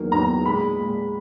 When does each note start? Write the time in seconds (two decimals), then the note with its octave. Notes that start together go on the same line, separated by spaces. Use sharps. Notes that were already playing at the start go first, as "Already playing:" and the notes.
Already playing: E2 D#3 F#3 A#3
0.12 E2 D#3 F#3 A#3 A#5
0.46 A#2 G#3 B5
0.79 A#2 G#3